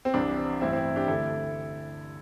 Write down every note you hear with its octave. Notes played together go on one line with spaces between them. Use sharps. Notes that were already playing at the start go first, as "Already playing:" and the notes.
C4
C2 C3 E3 D4
A1 G2 E3 C4 E4
C4 E4
D4 G4
D2 D3 E4 A4